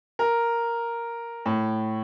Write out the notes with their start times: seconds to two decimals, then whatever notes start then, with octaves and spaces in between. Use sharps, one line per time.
0.19 A#4
1.46 A2